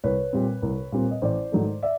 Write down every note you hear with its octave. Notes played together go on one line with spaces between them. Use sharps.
C2 B4 C#5
A#2 G3 C4
C2
A#2 G3 C4
D#5
A1 C5 D5
G#2 D#3 F#3 A3
D5 E5